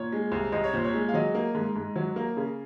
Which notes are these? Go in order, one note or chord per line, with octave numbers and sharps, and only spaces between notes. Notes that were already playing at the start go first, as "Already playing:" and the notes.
Already playing: A#2 C#5
G#3
C2
C2 D#5
C#5
A#2 C5
C#5
G#3
F5
F#3 D#5
A#3
G#2
G#2
F#3
A#3
C#3